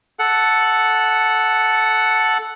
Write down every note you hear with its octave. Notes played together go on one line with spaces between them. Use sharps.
A4 F#5